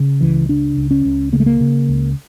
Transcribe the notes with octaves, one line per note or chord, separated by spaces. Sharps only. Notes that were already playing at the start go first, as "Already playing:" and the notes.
Already playing: C#3
C#2 E3
C#3 D4
C#2
C#4
C#2
C#3 A#3
A3
A#3
C#3
C#2